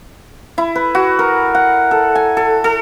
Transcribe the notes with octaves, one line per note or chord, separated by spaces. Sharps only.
E4
B4
F#4
A#4
F#5
A4
G#5
A4
A4